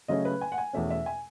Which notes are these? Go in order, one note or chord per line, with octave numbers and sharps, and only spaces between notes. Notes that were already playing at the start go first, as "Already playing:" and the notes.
C#3 F#3 A3 C#4 D#5
B4
G#5
F#5
G#5
E2 B2 A3 C#4 E5
E5
G#5